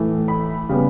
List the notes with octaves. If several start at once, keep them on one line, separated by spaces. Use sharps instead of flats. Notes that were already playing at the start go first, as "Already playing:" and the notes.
Already playing: A2 E3 A3
B5
C#3 G3 B3